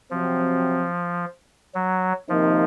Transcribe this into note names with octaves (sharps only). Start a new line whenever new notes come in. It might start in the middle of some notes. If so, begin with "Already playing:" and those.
C3 F3 F#3 C4
F#3
C3 D#3 F3 A#3 D#4